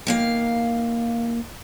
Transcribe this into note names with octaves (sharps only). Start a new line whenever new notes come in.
D#3 A#3 F5